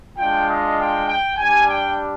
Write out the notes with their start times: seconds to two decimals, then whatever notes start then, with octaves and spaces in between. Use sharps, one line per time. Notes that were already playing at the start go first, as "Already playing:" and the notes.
0.18 G#3 D4 F4 G5
0.49 D#5
0.79 G5
1.07 G5
1.37 G3 D4 G4 G#5
1.68 G5